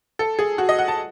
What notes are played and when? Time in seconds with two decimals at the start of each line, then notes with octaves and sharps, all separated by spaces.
0.19 A4
0.39 G#4
0.58 F#4
0.69 D#5
0.79 F#5
0.88 A5